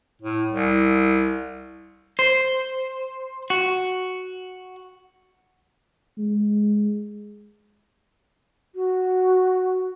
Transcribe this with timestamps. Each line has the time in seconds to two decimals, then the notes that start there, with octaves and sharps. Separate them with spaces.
0.21 A2
0.52 C2
2.19 C5
3.50 F#4
6.18 G#3
8.75 F#4